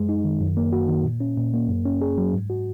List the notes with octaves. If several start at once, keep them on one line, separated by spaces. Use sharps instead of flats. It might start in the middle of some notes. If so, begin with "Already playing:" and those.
Already playing: F#2 G#3
D#4
D#3
F#2
A#3
F#4
D#3
A#2
C#4
A#2
A#3
F#2
C#4
G#4
F#3
G#2
F#4